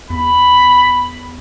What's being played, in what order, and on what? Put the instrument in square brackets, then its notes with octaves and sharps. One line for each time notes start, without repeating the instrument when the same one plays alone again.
[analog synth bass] E2 [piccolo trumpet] B5